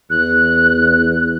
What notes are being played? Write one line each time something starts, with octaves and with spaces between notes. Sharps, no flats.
E2 F#6